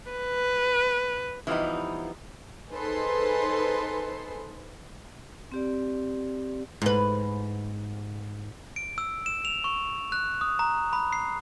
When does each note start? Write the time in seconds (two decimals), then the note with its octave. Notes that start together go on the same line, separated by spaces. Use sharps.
0.11 B4
1.47 E3 F3 G3 B3 D#4
2.71 D#4 G#4 A4 B4 C5 C6
5.52 C4 G4 D5
6.82 G#2 B4
8.76 D7
8.98 E6
9.26 E7
9.45 F7
9.64 C#6
10.12 F#6
10.41 D#6
10.59 A#5
10.93 B5
11.13 C7